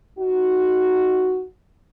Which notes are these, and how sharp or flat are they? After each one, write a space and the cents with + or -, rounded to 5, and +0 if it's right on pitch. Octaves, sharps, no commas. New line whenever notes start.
D#4 +0 F#4 +0